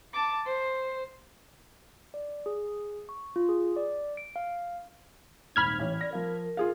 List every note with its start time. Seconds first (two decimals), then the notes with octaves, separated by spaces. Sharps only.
0.13 A5 D6
0.45 C5
2.14 D5
2.46 G#4
3.09 C#6
3.36 F4
3.49 G#4
3.76 D5
4.17 D7
4.36 F5
5.56 D#1 G#1 D#4 B5 F6 G#6
5.79 A1 C#5
6.01 D5 A#6
6.13 F3 A#4 F5
6.57 F4 G#4 F5